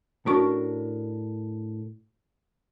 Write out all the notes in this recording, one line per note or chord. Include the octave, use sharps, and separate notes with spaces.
A2 C#4 D4 F#4 A#4 C#6